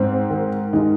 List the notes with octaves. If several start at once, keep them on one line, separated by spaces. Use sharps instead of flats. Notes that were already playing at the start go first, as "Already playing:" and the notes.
Already playing: G#2 C4
D#3
G#3 D#4